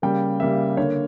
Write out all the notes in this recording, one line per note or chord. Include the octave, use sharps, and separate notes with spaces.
C#3 G3 A#3 G5
C#3 G3 A#3 E5
D3 A#3 C#5